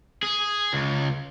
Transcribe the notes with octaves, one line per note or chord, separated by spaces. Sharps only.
G#4
C#2